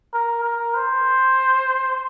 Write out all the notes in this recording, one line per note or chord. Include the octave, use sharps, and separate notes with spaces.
A#4
A#4
C5